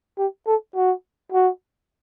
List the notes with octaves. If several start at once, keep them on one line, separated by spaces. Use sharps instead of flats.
G4
A4
F#4
F#4